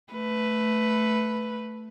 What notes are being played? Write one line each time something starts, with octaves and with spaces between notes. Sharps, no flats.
A3 B4